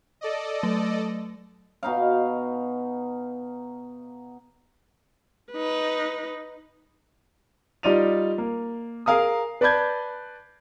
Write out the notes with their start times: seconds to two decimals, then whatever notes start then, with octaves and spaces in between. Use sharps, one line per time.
0.21 A4 D5 D#5
0.63 F#3 A3
1.83 B2 D#4 F5
5.52 D#4 B4
7.83 G3 D#4 F4 D5 D#7 F7
8.38 A#3
9.06 G#4 A#4 F5 A#5 D#6
9.61 B4 D5 A5 B5 G6 G#6